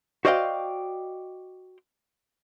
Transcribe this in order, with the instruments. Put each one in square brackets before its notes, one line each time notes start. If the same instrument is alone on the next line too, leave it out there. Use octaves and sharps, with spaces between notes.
[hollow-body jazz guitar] F#4 C5 D5 D#5 F5 G5